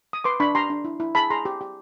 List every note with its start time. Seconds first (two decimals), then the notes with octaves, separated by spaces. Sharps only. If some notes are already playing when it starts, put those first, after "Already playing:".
0.13 D#6
0.24 B4 C6 D6
0.40 D4 B5 C#6
0.55 G4 A#5 C6
0.70 D4
0.85 E4
1.00 E4
1.15 G#4 A5 B5
1.30 G#4 A#5 C6
1.45 G4
1.61 G4